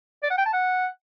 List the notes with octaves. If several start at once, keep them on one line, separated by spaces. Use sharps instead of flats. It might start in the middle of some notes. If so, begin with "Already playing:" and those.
D5
F#5
G5
A5
F#5